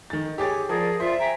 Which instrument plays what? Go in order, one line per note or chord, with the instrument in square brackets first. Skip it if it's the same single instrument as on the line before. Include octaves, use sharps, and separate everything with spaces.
[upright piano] D#3 A6
[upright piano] G4 G#4 A6 [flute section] C#5 G#5 D6
[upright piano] F3 [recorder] G#4 [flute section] A#4 D5
[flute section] F4 D5 [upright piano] C5 [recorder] E5
[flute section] G5 G#5 A#5